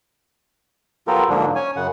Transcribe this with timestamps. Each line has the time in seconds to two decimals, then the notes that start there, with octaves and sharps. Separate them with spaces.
1.07 F#3 B3 F4 G4 A4 A#4
1.30 G#2 D3 F3 F#3 A#3 D4
1.55 C#4 C#5 G#5
1.76 F#2 C#3 F#5